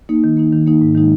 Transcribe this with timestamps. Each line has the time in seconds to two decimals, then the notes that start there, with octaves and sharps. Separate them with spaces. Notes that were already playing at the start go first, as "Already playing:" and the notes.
0.09 A#3 D#4
0.24 D#3
0.37 A#3 D#4
0.52 D#3
0.67 A#3 D#4
0.82 G#2
0.95 D#3 G#3 D#4